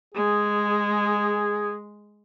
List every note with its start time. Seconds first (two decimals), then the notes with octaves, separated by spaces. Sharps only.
0.15 G#3 G#4